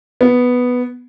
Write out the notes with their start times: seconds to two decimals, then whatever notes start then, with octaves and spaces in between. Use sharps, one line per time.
0.21 B3